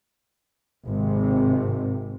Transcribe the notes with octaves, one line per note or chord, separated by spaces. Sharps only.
G#1 C3